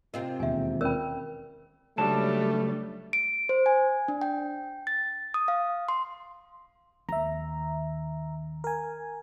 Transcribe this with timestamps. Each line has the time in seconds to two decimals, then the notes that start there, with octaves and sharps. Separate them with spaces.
0.14 C3 C4 F4 A#4 D#5
0.40 E1 D#2 G#3 E5 G#5
0.81 C#4 A#4 B4 G5 E6
1.98 C#2 F#3 G3 A3 D4 A5
3.13 D7
3.49 C5
3.66 G#5
4.08 D4
4.21 G5
4.87 A6
5.34 D#6
5.48 F5
5.89 C6
7.09 D#2 E5 A#5
8.64 A#4 G#5